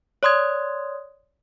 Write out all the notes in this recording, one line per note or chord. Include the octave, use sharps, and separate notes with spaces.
C#5 D5 C6 D#6 G#6